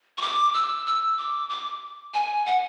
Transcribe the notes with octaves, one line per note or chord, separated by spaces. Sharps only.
C#6
D6
E6
E6
D6
D6
G#5
F#5